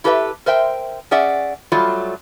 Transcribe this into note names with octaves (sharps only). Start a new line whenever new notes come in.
E4 G4 A4 B4 D5 E5
A#4 C5 E5 G5
C#4 G#4 D5 E5 F#5
F#3 G3 A3 F4